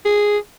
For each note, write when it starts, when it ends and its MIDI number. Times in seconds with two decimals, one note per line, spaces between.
0.05 0.38 68